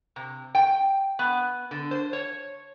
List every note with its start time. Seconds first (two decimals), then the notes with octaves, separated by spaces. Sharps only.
0.16 C3
0.55 G5
1.19 B3
1.71 D3
1.91 C5
2.13 C#5